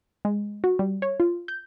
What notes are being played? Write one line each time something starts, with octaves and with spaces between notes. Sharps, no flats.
G#3
F#4
G3
C#5
F4
G6